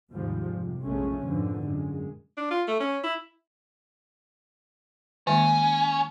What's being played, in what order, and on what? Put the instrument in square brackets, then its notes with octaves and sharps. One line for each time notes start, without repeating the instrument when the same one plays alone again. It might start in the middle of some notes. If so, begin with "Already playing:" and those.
[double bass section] D#2 G#2 C3 F3 G3 G#3
F2 C3
F1 A#1 G#3 A3 C#4
F2 G#2 B2 D3 F3
F#2 A#2 G#3
[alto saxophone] D4
F4
A3
C#4
E4
[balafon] D#3 G#3 A#3 [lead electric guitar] C#4